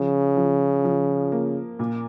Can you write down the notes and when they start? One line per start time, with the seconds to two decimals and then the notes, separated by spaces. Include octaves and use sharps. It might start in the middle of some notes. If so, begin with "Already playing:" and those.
Already playing: C#3 F3
0.37 F3
0.84 F3
1.32 A#3
1.79 A#2